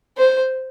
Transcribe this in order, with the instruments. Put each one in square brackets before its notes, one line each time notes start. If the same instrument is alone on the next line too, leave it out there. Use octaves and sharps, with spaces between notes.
[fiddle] C5